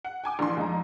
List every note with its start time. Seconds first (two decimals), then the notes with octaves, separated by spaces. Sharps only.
0.04 F#5
0.24 G5 G#5 D6
0.39 A#1 D3 E3 C6
0.57 F2 G#3 D#4 A#5